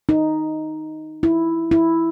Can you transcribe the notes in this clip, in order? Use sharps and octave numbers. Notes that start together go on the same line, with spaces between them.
D#4
E4
E4